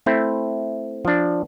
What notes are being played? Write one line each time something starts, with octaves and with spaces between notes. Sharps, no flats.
A3 C4 E4
F3 D4